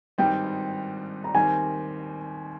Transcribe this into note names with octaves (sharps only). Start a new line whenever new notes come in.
G#1 G2 G3 C4 D#4 G5
A#5
D#2 D#3 G3 C4 G#5